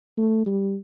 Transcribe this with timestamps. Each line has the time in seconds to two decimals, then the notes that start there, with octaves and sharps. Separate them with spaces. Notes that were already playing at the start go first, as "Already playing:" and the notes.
0.17 A3
0.46 G3